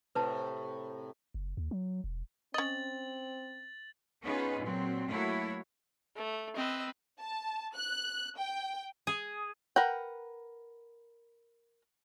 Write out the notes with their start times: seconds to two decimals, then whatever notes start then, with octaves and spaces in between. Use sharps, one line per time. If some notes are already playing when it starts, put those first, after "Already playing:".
0.15 A2 C3 B4 A5
1.34 F#1
1.57 D#2
1.71 F#3
2.04 E1
2.54 C4 C#4 D#5 A6 F#7
4.24 B3 C#4 D#4 F4 G#4 B4
4.61 A#2 F#3 C4
5.09 F#3 A3 A#3 E4 F#4 C#5
6.16 A3
6.56 C4 B4 D#5 E6
7.19 A5
7.76 F#6
8.38 G5
9.07 G#4
9.76 A#4 B4 F#5 G5